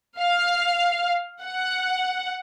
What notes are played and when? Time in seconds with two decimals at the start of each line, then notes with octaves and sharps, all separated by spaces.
0.20 F5
1.43 F#5